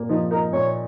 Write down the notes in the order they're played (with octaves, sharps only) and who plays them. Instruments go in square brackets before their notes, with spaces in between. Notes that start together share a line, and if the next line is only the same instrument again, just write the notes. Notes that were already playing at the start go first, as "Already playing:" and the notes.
Already playing: [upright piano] A#2 A#3
[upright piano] F3 [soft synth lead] D#4
[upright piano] D#4 [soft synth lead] A#4
[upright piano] A#2 [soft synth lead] C#5